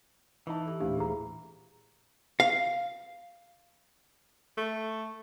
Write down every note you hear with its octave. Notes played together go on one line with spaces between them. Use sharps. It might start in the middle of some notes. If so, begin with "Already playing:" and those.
E3 D#4 A5
G4 A4
D#1 A2 D4 E4 G4 F5
G#4 A#5
F5
A3